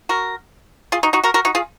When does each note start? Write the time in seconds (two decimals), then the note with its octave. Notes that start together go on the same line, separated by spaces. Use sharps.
0.09 F#4 A#4
0.92 F4 G#4
1.03 D#4 F#4
1.13 D#4 F#4
1.23 F#4 A#4
1.34 F#4 A#4
1.45 D#4 F#4
1.55 F4 G#4